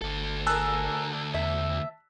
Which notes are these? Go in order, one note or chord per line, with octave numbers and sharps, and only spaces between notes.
G1 D2 A4
G#4 A#4 A5 A#5 E6 F#6
E2 E5